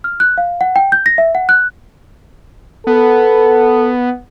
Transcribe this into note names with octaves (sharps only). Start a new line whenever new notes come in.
F6
F#6
F5
F#5
G5
G6
A#6
E5
F#5
F#6
B3 A4